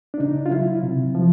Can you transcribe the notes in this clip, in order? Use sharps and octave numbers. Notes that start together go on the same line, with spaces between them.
D4
C#3 D#4
F4
F#3 E4
C3
F3